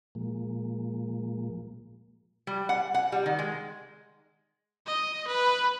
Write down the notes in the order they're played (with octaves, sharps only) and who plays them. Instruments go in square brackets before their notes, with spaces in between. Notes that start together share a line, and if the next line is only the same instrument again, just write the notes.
[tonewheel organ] A#2 F3 G#3 A#3
[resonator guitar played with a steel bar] G3
F#5
F#5
G3
D#3
G#3
[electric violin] D#5
B4